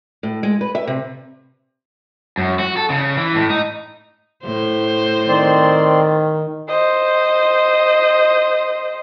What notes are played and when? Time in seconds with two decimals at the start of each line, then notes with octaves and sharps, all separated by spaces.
0.23 A2
0.43 G#3
0.61 B4
0.75 E5
0.87 C3
2.38 F#2
2.60 F#4
2.77 A4
2.90 C#3
3.17 E3
3.35 A2
3.50 D#4
4.45 A2 C5
5.28 D#3 C4 D5 C6
6.69 C5 D#5